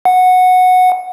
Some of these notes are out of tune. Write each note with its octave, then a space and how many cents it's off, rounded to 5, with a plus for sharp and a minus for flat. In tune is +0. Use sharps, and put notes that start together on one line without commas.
F#5 -10